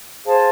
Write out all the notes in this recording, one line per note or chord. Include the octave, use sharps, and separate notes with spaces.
G#4 C5 F5 A5